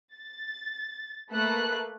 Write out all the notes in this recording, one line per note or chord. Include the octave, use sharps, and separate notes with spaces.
A6
A3 A#3 B4 F#6